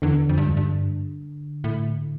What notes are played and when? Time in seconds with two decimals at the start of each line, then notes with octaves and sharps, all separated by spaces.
0.02 E2 D3
0.29 F2
0.37 G2
0.47 F2
0.57 G2
1.64 A2